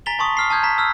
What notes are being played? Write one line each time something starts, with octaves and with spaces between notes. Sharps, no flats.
G#5 A#5 A6 B6 F7 G7
A5 C6 C#6 D#6
D#6 F6 C7
A5 D#6 F6 G6 G#6
A#5 B6
E6 F6